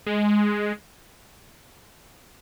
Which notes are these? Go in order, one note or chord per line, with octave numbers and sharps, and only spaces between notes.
G#3